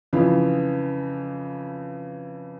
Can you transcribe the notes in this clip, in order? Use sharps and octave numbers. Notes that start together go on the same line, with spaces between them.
F2 C#3 E3 F3